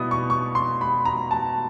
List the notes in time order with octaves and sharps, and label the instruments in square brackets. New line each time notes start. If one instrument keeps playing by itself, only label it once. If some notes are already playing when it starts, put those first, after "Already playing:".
Already playing: [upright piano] B2 G3 B3 E4 D#6
C#6
C#6
C6
B5
A#5
A5